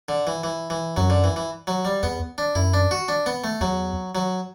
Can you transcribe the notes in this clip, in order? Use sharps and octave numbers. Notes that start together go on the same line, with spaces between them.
D3
E3
E3
E3
F#2 F#3
D3
E3
E3
F#3
G3
E2 B3
D4
F#2 E4
D4
F#4
D4
B3
A3
E2 F#3
F#3